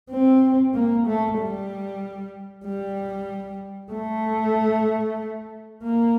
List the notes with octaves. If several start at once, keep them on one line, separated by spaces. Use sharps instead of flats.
C4
A#3
A3
G3
G3
A3
A#3